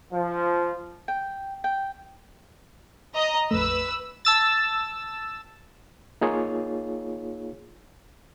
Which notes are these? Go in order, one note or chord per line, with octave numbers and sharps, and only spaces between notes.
F3
G5
G5
D#5 A#5
A#1 F2 A3 B4 E6
A5 E6 A6
A#3 D#4 F4 G#4 C#5